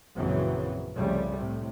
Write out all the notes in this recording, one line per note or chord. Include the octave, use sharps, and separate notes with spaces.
A#1 F#2 C#3 E3 F#3 C4
C2 F2 C#3 G3 A3
A2 C3